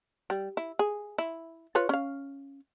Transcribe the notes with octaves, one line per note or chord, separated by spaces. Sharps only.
G3
E4
G#4
E4
F4 B4 C#5
C#4 F5